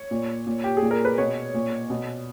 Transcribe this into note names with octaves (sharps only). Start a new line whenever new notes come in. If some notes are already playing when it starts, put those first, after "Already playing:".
Already playing: C#5
A#2
A#2
G4
G#4
A#2
A#4
B4
B2 C#5
A#2
B2